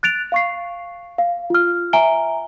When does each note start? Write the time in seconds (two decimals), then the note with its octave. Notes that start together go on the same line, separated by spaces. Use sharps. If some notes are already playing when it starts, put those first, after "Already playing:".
0.03 F#6 A6 D7 F7
0.32 F5 C#6 C7
1.18 F5
1.50 F4 F6
1.93 E5 G#5 A#5 D7 G7